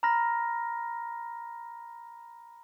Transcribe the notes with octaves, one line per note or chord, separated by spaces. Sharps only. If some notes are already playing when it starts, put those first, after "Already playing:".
A#5 B5 F6 A#6